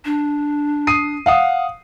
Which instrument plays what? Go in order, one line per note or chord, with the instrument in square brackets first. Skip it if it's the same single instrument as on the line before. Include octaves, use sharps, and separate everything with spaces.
[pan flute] D4
[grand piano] D#6 C7 D#7
F5 F#5 D#6